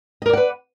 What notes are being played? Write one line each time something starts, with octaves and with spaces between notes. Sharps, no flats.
A#4 B4 D5 D#5 F#5